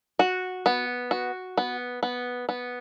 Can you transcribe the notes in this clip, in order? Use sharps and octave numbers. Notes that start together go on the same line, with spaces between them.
F#4
B3
F#4
B3
B3
B3